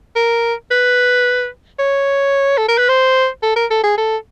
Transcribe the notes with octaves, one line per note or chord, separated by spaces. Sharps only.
A#4
B4
C#5
A4
A#4
B4
C5
A4
A#4
A4
G#4
A4